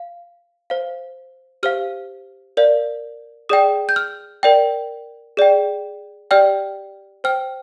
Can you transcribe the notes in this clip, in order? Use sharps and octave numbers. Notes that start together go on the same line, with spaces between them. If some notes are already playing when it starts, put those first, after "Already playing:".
Already playing: F5
C5 F5
G4 C5 F5 F6
A#4 D5 F5
G#4 D5 G5 D#6
G6
F6
A#4 D5 G5
G#4 D5 G5
G4 D5 G5 F6
C5 G5 F6